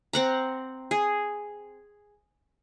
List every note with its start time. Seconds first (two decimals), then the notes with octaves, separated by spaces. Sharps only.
0.13 C4 F#5 A#5
0.91 G#4